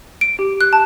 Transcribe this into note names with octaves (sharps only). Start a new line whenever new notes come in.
D7
G4
F#6
A5